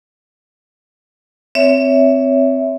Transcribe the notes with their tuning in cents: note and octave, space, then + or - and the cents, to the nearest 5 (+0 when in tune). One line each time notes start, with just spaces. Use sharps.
C4 -5 C#5 +20 E5 +0